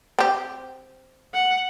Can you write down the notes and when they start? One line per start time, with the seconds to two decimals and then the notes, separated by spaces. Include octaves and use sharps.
0.19 C4 G4
1.34 F#5